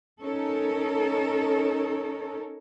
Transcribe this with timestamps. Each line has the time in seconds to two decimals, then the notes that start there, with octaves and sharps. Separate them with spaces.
0.21 C#4 D#4 A4 A#4 C#5